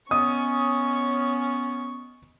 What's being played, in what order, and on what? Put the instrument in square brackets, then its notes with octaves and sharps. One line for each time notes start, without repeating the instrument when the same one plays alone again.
[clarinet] B3 [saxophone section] C#4 [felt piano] D#5 D#6 [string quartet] C#6